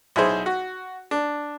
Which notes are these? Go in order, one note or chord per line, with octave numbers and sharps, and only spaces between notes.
B1 E4 G#4 C5
F#4
D4